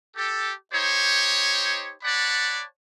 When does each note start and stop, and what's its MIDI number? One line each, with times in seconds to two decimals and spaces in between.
0.16 0.52 67
0.16 0.52 69
0.72 1.93 63
0.72 1.93 67
0.72 1.93 72
0.72 1.93 73
2.03 2.63 73
2.03 2.63 74
2.03 2.63 78
2.03 2.63 81
2.03 2.63 83